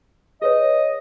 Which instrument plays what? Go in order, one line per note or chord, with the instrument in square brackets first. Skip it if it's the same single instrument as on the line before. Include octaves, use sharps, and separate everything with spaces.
[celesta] G#4 B4 C#5 [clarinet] D#5